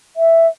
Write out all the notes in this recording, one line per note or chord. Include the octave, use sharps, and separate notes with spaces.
E5